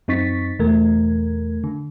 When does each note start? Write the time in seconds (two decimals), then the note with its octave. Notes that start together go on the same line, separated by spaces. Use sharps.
0.08 F#2 C4 D#4 C#6 A6 B6
0.59 E2 B2 E3 A3 A#4 G#6
1.64 D3